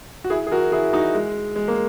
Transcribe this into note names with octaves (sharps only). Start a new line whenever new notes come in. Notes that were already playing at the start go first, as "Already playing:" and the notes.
F#4
E4 G#4
G#4
F#4 A#4
E4 G#4
D#4 F#4
G#3
G#3
A#3